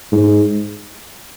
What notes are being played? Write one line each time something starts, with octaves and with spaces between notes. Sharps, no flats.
G#2